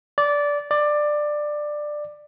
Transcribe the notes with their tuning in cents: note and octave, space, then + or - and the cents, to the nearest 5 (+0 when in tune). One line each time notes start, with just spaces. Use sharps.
D5 -15
D5 +15